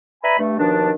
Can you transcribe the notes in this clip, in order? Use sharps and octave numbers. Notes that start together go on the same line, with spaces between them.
B4 D5 E5 G#5 A#5 B5
G2 A3
D#2 B2 D#3 F3 D4